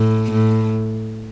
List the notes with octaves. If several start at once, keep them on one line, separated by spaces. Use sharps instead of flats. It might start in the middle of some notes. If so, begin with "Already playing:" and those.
Already playing: A2
A2